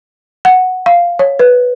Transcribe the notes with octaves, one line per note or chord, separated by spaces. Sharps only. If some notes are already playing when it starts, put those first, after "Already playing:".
F#5
F5
C#5
B4